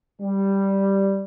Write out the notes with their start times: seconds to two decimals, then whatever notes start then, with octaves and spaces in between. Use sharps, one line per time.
0.21 G3